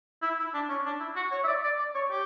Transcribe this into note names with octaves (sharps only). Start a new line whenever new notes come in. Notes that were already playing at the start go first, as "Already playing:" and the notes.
E4
E4
D4
C#4
D4
E4
F#4
C#5
E5
D5
D5
D5
C#5
G4